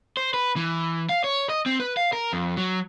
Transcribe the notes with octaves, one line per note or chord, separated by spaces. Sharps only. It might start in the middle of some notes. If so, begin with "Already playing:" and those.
C5
B4
E3
F5
C#5
D#5
C4
B4
F5
A#4
F2
F#3